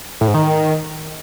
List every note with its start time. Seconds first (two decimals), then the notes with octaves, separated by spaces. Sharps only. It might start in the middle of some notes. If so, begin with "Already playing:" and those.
0.21 A2
0.28 G#2
0.34 D#3